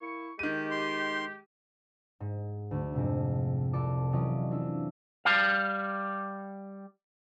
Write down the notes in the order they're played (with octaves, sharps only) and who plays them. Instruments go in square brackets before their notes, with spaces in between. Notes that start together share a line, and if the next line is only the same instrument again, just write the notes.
[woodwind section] A#3 E4 C#6
[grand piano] D#3 D#7 [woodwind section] G#3 G4
[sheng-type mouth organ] C6
[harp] G#2
D2 A3
F2 G#2 C3
C2 F4 A4 D5 D6
E3 F#3 C#4 F4 D5 D#5
C4 D4 E4 F4
[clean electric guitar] G3 F5